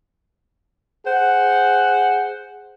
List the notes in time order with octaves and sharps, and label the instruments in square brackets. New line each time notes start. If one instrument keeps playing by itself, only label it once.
[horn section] G#4 C5 F#5